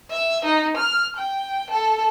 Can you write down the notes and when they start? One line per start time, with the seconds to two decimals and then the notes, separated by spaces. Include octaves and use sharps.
0.11 E5
0.45 D#4
0.77 F6
1.17 G5
1.71 A4